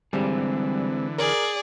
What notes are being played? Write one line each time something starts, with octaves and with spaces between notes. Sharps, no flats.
D3 E3 G3 G#3 C4 G#4
G#4 A#4 D5